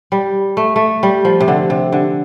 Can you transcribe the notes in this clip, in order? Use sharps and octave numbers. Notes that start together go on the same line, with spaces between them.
G3
A3
A3
G3
F3
C3
D3
C3
D3